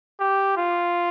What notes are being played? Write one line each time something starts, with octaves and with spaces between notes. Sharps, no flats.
G4
F4